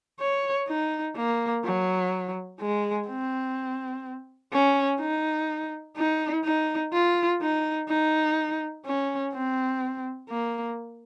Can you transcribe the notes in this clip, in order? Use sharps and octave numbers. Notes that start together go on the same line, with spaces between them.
C#5
D#4
A#3
F#3
G#3
C4
C#4
D#4
D#4
D#4
F4
D#4
D#4
C#4
C4
A#3